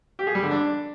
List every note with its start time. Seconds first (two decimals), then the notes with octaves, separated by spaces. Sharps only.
0.19 G4
0.27 G#4
0.35 G3
0.43 D3
0.51 D4